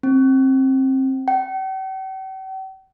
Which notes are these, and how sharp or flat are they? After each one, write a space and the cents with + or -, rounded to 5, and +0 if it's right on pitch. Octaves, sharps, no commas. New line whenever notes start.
C4 +25
G5 -45